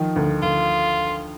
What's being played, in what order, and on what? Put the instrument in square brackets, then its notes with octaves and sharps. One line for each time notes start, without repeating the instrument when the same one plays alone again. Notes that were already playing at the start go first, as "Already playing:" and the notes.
Already playing: [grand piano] D#3 F3
D2
[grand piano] D2 [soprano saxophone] F4